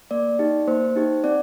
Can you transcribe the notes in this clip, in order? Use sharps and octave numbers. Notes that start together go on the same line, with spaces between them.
A#3 D5
D#4 G4
A#3 C5
D#4 G4
C4 D5